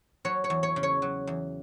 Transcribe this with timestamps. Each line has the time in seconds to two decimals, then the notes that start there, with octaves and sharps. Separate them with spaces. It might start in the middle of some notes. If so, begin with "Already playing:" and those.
0.25 F#3 C#5
0.44 C#5
0.50 E2
0.63 C#5
0.76 C#3
0.83 C#5
1.02 F#3
1.27 E2